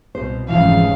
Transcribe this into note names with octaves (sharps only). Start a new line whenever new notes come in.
C2 B2 C5
F1 G#2 C#3 E3 F3 F5